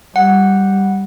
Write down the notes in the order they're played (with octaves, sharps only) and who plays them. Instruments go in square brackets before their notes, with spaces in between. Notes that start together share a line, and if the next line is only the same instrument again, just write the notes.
[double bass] G3 [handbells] F#5